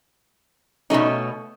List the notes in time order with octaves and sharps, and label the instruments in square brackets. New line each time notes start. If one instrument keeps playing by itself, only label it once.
[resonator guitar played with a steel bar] B2 F#3 A3 C#4 D#4